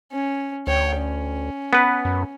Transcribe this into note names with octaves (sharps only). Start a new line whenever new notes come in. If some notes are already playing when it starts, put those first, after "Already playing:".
C#4
D2 C#5 G5
C#4
B3 B4
F#2